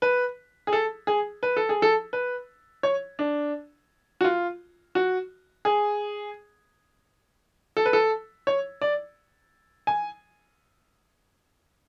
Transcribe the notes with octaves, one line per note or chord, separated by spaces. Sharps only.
B4
G#4
A4
G#4
B4
A4
G#4
A4
B4
C#5
D4
F#4
F4
F#4
G#4
A4
B4
A4
C#5
D5
G#5